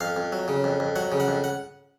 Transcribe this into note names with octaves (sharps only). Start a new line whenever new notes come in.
F2 F5
F2
F#3
C#3
F2
F2
F#3 F#5
C#3
F#5
F2
F#5